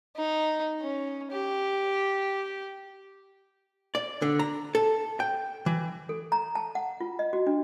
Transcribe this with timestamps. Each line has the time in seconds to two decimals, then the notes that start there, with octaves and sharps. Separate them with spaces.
0.16 D#4
0.81 C#4
1.32 G4
3.95 D5
4.22 D3
4.39 A#5
4.75 A4
5.20 G5
5.66 E3
6.09 A4
6.32 A#5
6.55 A5
6.75 F#5
7.00 F4
7.19 D#5
7.33 F#4
7.47 D4